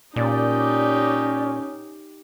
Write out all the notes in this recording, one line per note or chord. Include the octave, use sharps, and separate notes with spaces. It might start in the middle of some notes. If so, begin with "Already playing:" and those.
A#2 C#4 D#4 G4 D5